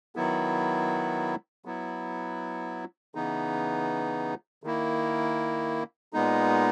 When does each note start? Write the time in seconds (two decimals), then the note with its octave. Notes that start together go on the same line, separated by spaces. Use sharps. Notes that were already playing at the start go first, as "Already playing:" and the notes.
0.16 D#3 F#3 B3 E4
1.65 F#3 B3 E4
3.15 C#3 E3 B3 D#4
4.64 D#3 A#3 E4
6.13 A#2 G#3 B3 D#4